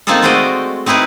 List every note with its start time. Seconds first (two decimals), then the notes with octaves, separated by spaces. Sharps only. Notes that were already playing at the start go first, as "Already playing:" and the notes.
0.07 A#3 C4 D#4 F4 G#4 A4
0.22 G#3 A3 F#4 C5 D5 D#5
0.86 C4 D#4 E4 G#4 B4